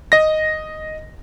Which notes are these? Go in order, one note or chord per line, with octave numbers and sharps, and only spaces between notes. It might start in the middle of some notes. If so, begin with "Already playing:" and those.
D#5 A#6